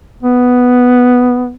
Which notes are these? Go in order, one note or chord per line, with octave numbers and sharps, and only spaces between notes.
B3